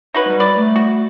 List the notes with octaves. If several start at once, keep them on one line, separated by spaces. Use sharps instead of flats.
D#4 F#4 B4 C#5
G3
B4 D5
A3
F#4